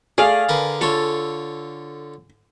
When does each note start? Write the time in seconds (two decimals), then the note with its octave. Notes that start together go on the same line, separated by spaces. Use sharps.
0.18 A3 G#4 D5 F5
0.49 D3 A#4 B4
0.81 D3 F4 A4 C#5